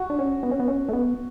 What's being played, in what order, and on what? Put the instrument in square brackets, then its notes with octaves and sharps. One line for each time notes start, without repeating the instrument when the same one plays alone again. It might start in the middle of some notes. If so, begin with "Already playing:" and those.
Already playing: [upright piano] F#4
[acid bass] D4
C#4
B3
C#4
B3
C#4
A3
B3